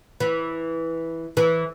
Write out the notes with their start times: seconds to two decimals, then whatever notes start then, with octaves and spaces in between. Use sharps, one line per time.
0.20 E3
1.37 E3